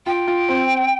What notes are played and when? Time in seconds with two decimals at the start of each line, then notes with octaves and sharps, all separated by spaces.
0.06 F4 G5
0.27 F4
0.49 C4